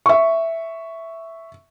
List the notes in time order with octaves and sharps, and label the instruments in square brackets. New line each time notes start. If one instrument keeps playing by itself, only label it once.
[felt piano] E5 C#6